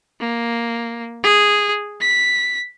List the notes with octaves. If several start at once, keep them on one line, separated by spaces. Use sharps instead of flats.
A#3
G#4
B6